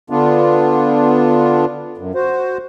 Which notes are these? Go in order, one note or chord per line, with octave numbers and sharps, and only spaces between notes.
D3 B3 D4 F4
F#2
F#4 C5